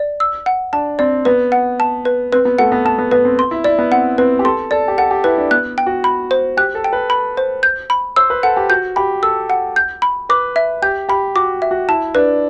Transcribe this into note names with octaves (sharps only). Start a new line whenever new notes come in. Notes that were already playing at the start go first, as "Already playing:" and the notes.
Already playing: D5
E6
F#5
D4 A5
C4 D5
B3 B4
F#5
A5
B4
C4 B4
B3
A3 F#5
B3
B3 A5
B3
B3 B4
C4
C6
E4
E4 D5
B3
C4 F#5
C4 B4
G4
A4 C6
A4 D5
G4
A4 F#5
G4
E4 B4
D4
B3 F#6
G5
F#4
B5
C5
G4 F#6
A4
G5
B4
B5
C5
G6
B5
C5 E6
B4
A4 F#5
G4
F#4 G6
G4 B5
A4 E6
F#5
G6
B5
B4 D6
E5
G4 G6
G4 B5
F#4 D6
E5
F#4
E4 A5
D4 B4